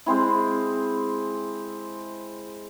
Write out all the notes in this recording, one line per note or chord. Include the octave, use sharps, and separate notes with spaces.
G#3 C4 E4